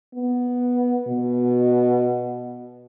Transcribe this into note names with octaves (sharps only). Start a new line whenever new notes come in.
B3
B2